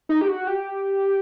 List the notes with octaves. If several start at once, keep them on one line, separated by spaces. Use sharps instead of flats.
D#4
G4
F#4
G4